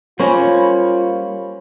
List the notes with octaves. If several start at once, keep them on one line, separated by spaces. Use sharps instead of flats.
G3 A#3 C#4 F4 C5 C#5 B5